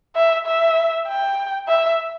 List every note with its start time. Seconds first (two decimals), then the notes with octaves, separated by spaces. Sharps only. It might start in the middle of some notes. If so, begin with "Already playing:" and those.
0.16 E5
0.47 E5
1.08 G5
1.68 E5